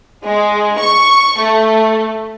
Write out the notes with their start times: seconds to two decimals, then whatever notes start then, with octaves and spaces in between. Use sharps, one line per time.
0.25 G#3
0.79 C#6
1.39 A3